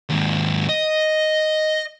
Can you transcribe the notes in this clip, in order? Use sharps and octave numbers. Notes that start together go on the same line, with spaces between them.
D#2 G#2
D#5